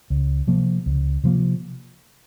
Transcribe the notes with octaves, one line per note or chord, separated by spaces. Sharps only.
C#2
C3 F3 A#3
C#2
C3 F3 A#3